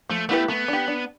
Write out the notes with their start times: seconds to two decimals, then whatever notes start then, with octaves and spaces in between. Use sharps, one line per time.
0.09 F3 A3
0.29 A3 B3 E4 G4 B4
0.48 A3 B3
0.68 D4 G4
0.88 D4